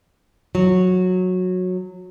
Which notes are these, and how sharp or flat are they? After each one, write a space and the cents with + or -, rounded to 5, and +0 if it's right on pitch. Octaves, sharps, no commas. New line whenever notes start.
F#3 -15